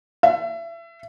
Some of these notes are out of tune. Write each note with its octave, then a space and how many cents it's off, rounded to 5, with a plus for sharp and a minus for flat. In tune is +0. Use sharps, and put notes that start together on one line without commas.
E5 +30